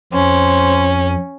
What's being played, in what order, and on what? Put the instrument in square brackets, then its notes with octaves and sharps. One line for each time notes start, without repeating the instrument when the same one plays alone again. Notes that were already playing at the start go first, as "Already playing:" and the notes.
[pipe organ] F2 [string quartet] C#4 [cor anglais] C5